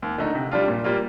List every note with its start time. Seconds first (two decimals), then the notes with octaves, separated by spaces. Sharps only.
0.02 D#2
0.18 D3 A3 D#4
0.35 C3
0.51 G3 D4 F4
0.68 A#2
0.84 G3 A#3 F4